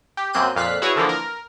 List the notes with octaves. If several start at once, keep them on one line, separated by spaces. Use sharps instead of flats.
G4
F#2 A#3 C4 F#6 G6 D#7
F2 A#2 F5 F#6 B6
E4 F#4 G#4 B4 C#5
D3 E3 F3 A#3
A#4